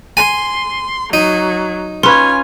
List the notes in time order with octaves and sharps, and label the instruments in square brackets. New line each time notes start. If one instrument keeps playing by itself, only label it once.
[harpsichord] G#5 [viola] C6
[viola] F#3 [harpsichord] D#4
[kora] C#4 B4 [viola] F4 G#5 [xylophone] C6